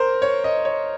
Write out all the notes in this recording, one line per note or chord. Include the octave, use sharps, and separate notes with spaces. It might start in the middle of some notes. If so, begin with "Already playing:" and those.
Already playing: A#4 C5
C#5
D#5
C#5